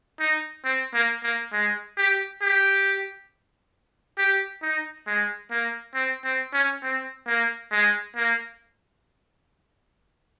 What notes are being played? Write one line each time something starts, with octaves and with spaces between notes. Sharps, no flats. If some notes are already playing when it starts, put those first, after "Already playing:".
D#4
C4
A#3
A#3
G#3
G4
G4
G4
D#4
G#3
A#3
C4
C4
C#4
C4
A#3
G#3
A#3